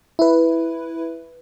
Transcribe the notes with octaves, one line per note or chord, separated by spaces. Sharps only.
E4 B4